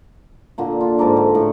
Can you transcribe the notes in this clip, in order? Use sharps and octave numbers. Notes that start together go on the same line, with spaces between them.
A#2 D3 A#3
F4
G#2 A4 A#4 D6
D3
A2